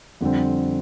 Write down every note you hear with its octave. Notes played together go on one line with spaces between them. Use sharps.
F2 D3 G3 C4